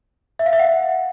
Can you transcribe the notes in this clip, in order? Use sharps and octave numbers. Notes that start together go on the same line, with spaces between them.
E5
F5
E5
F#5